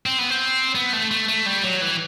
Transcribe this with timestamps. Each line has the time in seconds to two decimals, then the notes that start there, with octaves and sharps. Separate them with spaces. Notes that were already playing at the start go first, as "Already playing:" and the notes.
0.06 C4
0.19 B3
0.30 C4
0.75 B3
0.93 A3
1.11 A3
1.28 A3
1.46 G3
1.63 F#3
1.82 E3